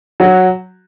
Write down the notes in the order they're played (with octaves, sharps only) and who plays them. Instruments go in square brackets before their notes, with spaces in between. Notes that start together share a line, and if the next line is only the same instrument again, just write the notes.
[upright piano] F#3 F#4